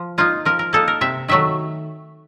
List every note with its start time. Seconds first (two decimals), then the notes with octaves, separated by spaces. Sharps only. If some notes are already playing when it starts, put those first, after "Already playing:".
Already playing: F3
0.18 A#3 D#4 F4
0.45 F3 A#4
0.59 A#4
0.73 A#3 D#4 A4
0.88 A#4
1.01 C3 E5
1.28 D#3 F#3 A3 E5